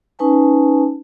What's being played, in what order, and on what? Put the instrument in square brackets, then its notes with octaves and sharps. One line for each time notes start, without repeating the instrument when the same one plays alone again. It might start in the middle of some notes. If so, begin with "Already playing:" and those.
[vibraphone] C#4 D#4 B4 G#5 A5